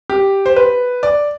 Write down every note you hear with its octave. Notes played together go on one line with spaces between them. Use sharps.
G4
C5
B4
D5